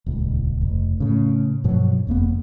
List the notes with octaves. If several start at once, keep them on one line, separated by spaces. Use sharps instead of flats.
D#1 C#2
F1
A2 C#3
G2 B2 F3 F#3
F#1 F2 A#3 B3